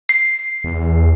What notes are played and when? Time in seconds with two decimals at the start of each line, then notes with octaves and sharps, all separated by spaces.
0.09 C7
0.64 E2